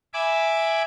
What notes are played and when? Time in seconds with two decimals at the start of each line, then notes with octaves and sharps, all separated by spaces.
0.13 E5 G#5 B5 D6